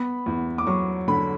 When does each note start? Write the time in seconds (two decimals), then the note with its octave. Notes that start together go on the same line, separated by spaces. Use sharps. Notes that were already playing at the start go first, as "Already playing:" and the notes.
Already playing: B3 B5
0.26 E2
0.58 D6
0.67 F#3 C#6
1.08 D3 B5